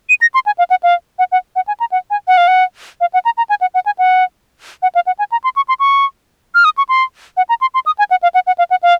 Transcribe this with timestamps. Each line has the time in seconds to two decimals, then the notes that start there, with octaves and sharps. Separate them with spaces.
0.09 D#7
0.21 A#6
0.34 C6
0.46 G#5
0.58 F5
0.70 F#5
0.83 F5
1.19 F#5
1.32 F#5
1.56 F#5
1.68 G#5
1.80 A#5
1.92 F#5
2.10 G#5
2.28 F#5
2.37 F5
2.48 F#5
3.01 F5
3.14 F#5
3.25 A#5
3.37 A#5
3.49 G#5
3.61 F#5
3.74 F#5
3.86 G#5
3.99 F#5
4.82 F#5
4.95 F5
5.07 F#5
5.19 G#5
5.32 A#5
5.44 C6
5.56 C#6
5.68 C6
5.80 C#6
6.55 F6
6.65 D#6
6.78 C#6
6.89 C6
7.37 F#5
7.49 A#5
7.61 C6
7.74 C6
7.86 D#6
7.98 G#5
8.11 F#5
8.23 F5
8.34 F#5
8.47 F#5
8.58 F5
8.70 F#5
8.83 F5